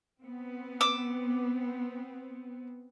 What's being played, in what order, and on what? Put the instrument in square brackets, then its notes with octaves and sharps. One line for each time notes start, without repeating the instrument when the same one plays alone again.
[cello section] B3 C4
[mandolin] D6 E6